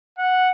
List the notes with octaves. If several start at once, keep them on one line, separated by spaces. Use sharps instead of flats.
F#5